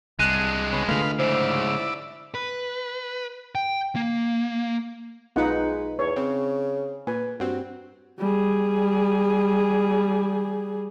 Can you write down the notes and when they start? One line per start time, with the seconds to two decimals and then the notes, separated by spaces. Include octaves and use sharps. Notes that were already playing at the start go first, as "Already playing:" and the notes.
0.19 C2 G#3 D4 F#6 D#7
0.73 C#3 B3
0.88 D3 A3 F4 B4 F5
1.19 G#2 C#3 E4 C5 D5
2.34 B4
3.55 G5
3.96 A#3
5.36 B1 G#3 D#4 F4 B4 F#5
5.99 E2 C#5
6.16 C#3 C4
7.07 A#2 B4 G#5
7.40 G2 C4 F#4
8.19 G3 G#4